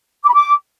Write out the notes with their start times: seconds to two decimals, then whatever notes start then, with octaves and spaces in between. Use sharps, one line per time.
0.23 D6
0.28 B5
0.34 D6